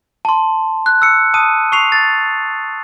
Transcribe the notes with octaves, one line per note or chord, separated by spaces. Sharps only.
A5 C6
F#6
E6 C#7
A5 D#6 D#7
C#6 C7 F7
A6